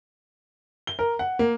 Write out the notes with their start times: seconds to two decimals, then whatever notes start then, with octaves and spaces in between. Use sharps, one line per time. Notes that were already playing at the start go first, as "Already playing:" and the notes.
0.87 G7
0.99 A#4
1.19 F#5
1.39 A#3